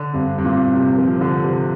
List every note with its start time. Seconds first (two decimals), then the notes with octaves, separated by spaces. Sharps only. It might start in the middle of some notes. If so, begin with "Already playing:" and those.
Already playing: D3
0.14 G2 C4
0.38 G2
0.44 A#2 C4
0.75 C3
0.98 F3
1.21 D3
1.44 C3